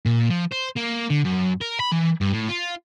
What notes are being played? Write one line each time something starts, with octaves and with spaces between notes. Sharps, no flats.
A#2
F3
C5
A#3
D3
F#2
A#4
B5
E3
G2
A2
F4